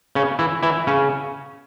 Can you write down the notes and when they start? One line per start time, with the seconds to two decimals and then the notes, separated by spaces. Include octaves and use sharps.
0.15 C#3 C#4
0.39 E3 E4
0.63 E3 E4
0.87 C#3 C#4